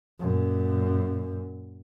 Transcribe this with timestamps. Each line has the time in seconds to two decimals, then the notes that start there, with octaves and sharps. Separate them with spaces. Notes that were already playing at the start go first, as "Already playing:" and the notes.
0.19 F#2 A#2